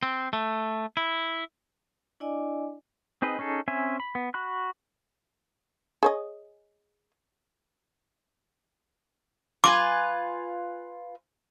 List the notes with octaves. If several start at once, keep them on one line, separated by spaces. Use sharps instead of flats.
C4
A3
E4
D4 E4 D5 D#5 G#5 D6
C4 D#4 G#4 B4 D#5
C#4 D#4 G#4 A4
C4 C#4 E5 G#5
B5
B3
F#4 B5 F#6
G#4 C#5 D#5
F4 B4 G#5 D6